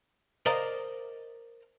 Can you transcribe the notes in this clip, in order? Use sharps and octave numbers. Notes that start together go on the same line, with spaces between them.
A#4 C5 D5 D#5 F5 A#5